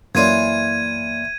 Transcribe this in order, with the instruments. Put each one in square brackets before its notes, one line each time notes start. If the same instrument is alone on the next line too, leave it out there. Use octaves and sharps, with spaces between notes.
[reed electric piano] F#2 A#3 D5 [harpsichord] E3 F4 C#5 [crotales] G#6 D#7